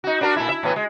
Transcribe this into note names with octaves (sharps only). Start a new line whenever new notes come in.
D#4 F#4
D4 F#4 A#4
A#2 A3 E4
E4 E5
A2 E3 B3
G#3